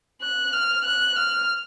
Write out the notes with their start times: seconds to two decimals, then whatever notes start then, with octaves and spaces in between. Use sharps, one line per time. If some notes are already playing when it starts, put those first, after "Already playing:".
0.22 F#6
0.53 F6
0.85 F#6
1.17 F6